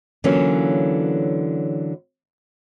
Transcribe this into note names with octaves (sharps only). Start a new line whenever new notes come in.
D3 E3 F#3 A#3 C#4 F4